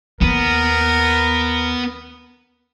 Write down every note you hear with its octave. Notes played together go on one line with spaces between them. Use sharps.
D#2 B3 A#4